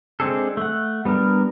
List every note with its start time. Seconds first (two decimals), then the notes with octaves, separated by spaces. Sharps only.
0.20 G#3 C4 D4 G#4 A4
0.57 A3 F#5
1.05 G3 B3 D4 A#4